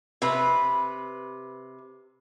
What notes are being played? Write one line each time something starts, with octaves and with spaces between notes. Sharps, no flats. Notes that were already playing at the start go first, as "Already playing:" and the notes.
C3 B4